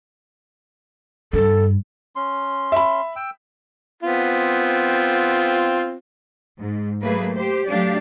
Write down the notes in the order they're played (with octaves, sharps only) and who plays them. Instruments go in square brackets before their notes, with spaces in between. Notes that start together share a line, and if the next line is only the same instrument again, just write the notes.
[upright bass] G2 [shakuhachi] A4
[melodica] C#4 C6
[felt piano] E5 B5
[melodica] G5 E6
[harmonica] B3 C4 F4
[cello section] G#2
F#3 A3 A#3 G#4 B4
G4 C5
F#3 A3 D4 G4 D5 F5